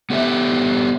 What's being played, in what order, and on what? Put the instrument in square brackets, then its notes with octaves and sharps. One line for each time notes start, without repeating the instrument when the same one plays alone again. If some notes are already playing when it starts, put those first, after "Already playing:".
[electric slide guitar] B3 G4 A4 E5